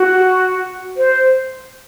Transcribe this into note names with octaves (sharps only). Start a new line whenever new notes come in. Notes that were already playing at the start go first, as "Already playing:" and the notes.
Already playing: F#4
C5